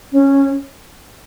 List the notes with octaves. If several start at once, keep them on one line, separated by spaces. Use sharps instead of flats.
C#4